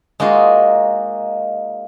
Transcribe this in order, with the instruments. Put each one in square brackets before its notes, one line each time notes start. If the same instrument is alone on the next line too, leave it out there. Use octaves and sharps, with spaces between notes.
[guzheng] G#3 A#3 D#4 F4 F#4